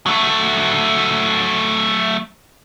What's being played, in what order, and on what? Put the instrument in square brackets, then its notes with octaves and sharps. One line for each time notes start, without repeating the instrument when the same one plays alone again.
[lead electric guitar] F#3 A3